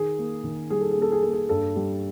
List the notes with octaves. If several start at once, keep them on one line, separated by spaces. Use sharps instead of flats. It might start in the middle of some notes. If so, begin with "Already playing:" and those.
Already playing: D#3 G#4
A#3
D#3
G3 G#4
A4
G#4
A#3
A4
G#4
A#3 A4
G#4
G2 A4
G3